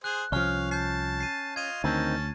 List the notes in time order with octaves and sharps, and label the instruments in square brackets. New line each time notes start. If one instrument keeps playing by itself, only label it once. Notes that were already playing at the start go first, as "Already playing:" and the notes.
[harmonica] G#4 C5 [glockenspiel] F#6
[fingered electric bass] C2 F3 [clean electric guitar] C#4 [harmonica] F5 [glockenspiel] C#6 F6
[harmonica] A5 [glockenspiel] G6 C7
[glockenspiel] C7 D#7
[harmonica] F4 D#5 [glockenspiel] G#6 D#7
[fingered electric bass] D2 [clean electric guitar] D#3 C4 [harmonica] C#4 A5